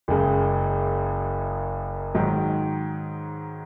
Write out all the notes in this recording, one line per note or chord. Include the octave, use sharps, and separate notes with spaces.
F#1 F#2 C#3 G#3
G#2 D#3 F#3